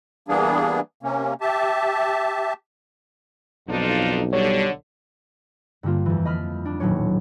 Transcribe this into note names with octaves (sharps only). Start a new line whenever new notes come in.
E3 G3 A#3 B3 D4 G#4
C3 A#3 C#4
G4 E5 A5
B1 F2 D4 D#4 F4
D3 G3 C#5
G2 D3 G3 A#3 F4
F2 E3
D#5 B5 F6 B6
D4
D#1 A2 F#3 C#4 C#5